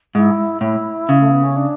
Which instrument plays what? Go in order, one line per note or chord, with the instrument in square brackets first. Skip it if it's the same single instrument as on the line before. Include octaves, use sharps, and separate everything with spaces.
[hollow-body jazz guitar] G#2 [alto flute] E4
[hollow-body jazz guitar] A2 [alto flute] E4
[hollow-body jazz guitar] C#3
[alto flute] A3
B3
C#4
D4